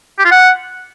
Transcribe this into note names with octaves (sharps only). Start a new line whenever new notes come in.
G4
F4
F#5